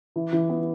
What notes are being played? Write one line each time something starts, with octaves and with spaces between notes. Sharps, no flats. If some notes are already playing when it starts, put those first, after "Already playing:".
E3
E3
B3